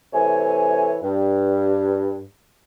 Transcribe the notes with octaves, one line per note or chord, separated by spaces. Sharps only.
C3 E3 A3 C#5 G#5
G2